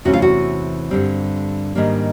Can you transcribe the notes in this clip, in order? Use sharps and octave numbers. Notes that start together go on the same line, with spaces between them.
E2 C3 E3 A3 C#4 F#4
F4
F#4
G2 D3 G3 C4
G#2 D#3 G3 A#3 D4